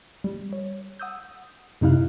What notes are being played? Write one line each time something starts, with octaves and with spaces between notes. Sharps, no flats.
G3
C#5
F#5 D#6 E6 G6
F#2 C3 D#4 E4 F5 F#6